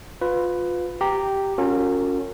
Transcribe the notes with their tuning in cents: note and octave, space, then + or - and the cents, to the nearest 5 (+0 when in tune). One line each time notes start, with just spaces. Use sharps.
F4 +25 B4 +15
G4 -5 A#5 -10
C#4 +0 F4 +45 A#4 -35